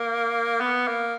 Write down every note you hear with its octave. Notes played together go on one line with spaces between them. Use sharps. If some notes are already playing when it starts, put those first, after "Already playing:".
Already playing: A#3
B3
A#3